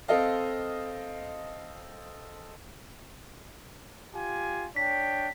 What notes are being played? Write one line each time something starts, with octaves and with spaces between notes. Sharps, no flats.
C4 A4 D#5 F5
F4 G4 G#5
D4 C#5 G5 B6